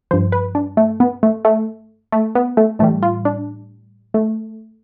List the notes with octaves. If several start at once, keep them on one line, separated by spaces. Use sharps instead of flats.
G2 F3 C5
B4
D4
A3
B3
A3
A3
A3
B3
A3
A2 E3 G3 A3
F4
D4
A3